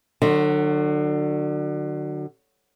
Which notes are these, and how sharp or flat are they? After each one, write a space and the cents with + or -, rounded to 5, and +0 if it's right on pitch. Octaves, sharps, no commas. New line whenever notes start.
D3 +30 F#3 -10